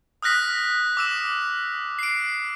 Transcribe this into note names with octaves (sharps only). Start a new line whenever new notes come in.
D#6 F6 F#6 A#6 B6
D6 E6 E7
C7 D7